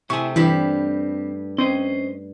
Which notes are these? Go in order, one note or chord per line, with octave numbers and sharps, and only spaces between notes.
C3 A3 E4 G#4 C#6
G2 E3 C4 G4 B5
C4 C#4 C5 D#5